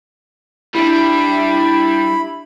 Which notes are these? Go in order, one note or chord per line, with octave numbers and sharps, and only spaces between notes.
G3 D4 E4 B5